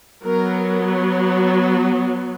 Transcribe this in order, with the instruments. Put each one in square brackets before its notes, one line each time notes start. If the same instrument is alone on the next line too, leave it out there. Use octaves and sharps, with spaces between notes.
[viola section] F#3 B3 A#4